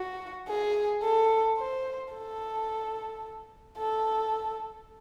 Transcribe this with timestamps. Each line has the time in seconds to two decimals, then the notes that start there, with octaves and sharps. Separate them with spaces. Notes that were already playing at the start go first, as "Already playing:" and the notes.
Already playing: F#4
0.48 G#4
1.02 A4
1.58 C5
2.13 A4
3.78 A4